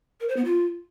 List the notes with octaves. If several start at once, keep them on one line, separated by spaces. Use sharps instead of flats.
A#4
C5
B3
F4